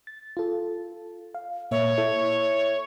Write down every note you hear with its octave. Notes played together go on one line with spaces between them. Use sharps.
A6
F4 A4
F5
A#2 A#3 C#5 E5
E4 A4 E5